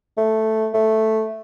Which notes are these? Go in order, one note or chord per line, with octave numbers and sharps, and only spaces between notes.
A3
A3